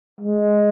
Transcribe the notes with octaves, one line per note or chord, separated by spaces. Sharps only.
G#3